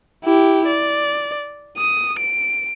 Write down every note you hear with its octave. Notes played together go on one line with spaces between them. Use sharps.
E4 G4
D5
D#6
D7